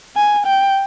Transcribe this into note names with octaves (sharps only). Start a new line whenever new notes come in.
G#5
G5